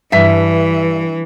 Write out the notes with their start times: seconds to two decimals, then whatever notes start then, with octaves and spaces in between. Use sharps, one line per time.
0.12 G2 E3 E5 B6